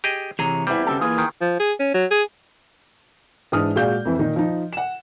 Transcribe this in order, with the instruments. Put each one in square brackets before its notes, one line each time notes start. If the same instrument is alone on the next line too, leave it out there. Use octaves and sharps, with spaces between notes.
[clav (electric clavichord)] G4 G#4 D#5
[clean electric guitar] C3 [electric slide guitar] E3 C#5 A#5 [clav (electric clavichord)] G#4
[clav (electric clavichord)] E2 G3 [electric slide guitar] C4 E4
[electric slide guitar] C#3 C4 G4 [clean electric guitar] A4
[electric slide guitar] E3 A#3 B4 [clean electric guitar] F4 G#4
[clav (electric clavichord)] D#3
[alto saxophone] F3
G#4
C#4
F#3
G#4
[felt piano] G#2 E3 D4 D#6 F6
A#2 G#3 F#4 D5 F5 G6
F2 E3
A#2 D#3 D#4
F3 D#4
F#5 E7